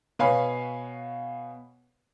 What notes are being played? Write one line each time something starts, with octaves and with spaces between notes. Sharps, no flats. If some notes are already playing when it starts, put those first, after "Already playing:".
B2 B4 C#5 F5 G#5 B5